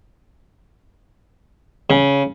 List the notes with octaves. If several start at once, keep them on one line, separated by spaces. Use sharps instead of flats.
C#3